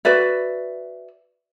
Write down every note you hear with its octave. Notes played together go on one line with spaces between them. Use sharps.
F#4 B4 D5 E5